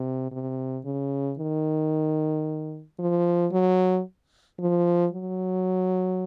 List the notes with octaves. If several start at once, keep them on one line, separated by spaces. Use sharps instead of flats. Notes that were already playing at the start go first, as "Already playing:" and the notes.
Already playing: C3
C3
C#3
D#3
F3
F#3
F3
F#3